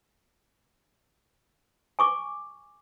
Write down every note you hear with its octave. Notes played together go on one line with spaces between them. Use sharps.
G#5 C#6 D6